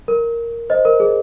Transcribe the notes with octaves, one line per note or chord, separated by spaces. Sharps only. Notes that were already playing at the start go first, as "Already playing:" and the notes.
A#4
C5 D#5
A#4
G#4